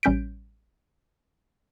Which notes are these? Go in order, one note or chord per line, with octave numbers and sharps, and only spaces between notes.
A1 G3 C#4 G6 B6 D7